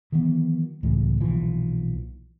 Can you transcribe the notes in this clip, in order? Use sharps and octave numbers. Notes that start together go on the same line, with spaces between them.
D#3 E3 F#3 B3
C#2 A2 E3 G#3
B1 A#2 E3 F3